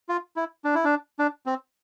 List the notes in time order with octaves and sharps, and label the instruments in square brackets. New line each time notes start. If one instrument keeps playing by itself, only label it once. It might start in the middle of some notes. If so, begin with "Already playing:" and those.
[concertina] F4
E4
D4
E4
D4
D4
C4